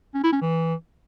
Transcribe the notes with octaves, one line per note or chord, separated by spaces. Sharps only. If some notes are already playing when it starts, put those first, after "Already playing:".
C#4
E4
C#4
E3